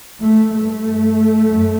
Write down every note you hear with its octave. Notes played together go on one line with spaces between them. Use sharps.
A3
G2 A3
F#2